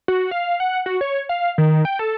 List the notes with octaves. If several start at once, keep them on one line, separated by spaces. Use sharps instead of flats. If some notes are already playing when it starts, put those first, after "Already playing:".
F#4
F5
F#5
F#4
C#5
F5
D#3
G5
A4